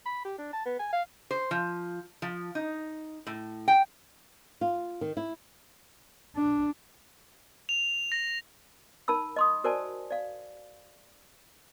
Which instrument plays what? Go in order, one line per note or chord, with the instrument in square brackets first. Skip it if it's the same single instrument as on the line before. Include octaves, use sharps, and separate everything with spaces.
[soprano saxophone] B5
G4
D4
A5
B3
G#5
F5
[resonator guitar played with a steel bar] C5
F3
F3
D#4
A2
G5
[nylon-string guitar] F4
D#3
E4
[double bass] D4
[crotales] F7
A#6
[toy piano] D#4 A#4 A5 B5 E6
D#5 C6 D#6
F#4 A#4 C5 D5 G#5 A5
D5 F5